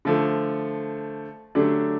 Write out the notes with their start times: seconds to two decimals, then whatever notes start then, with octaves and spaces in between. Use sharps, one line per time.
0.05 D3 F3 A3
1.55 D3 F#3 A3 D4 G4